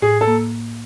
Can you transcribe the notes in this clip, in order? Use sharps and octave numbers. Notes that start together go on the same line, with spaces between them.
A2 G#4
A4
A#3